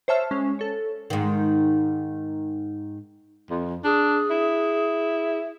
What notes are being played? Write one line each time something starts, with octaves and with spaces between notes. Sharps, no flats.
C5 C#5 E5 A5 F6
G#3 C#4
A4 C#5
G#2 D#3
F2
D4 G#4
E4